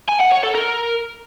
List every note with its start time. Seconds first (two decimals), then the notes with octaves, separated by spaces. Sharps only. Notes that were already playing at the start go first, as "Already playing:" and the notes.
0.09 G#5
0.21 F#5
0.32 C#5
0.44 A4
0.55 A#4